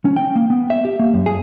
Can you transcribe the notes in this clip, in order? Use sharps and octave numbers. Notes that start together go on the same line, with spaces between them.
C#4
G5
A#3
B3
E5
G4
A#3
F#2
G#4